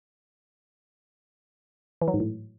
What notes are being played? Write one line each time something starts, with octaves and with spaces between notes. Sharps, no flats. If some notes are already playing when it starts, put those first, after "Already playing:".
E3
F#3
G#2
A2